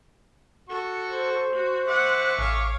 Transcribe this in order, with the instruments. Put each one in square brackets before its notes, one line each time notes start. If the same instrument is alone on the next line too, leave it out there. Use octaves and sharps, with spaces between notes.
[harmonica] F#4 C#6 [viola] A4
[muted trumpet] C5
[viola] F#4
[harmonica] E5 C#6 D6 [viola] F#5
[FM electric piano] A1 [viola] C#5 F5